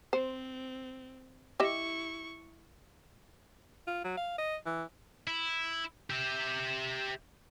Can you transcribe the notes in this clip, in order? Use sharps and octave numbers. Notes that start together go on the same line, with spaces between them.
C4 C5
E4 G4 D#5 E5 C#6
F4
F#3
F5
D#5
E3
E4
G4 E5